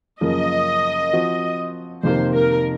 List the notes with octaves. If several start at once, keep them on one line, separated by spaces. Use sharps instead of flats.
F#2 C#3 F3 A#3 D#5
F3 C4 F#4
F2 C3 D#3 A#3 C5
A#4